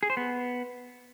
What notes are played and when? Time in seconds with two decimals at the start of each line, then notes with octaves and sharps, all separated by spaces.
0.03 G#4
0.10 C5
0.17 B3